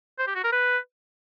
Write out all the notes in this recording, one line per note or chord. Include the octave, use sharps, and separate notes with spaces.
C5
G4
F#4
A#4
B4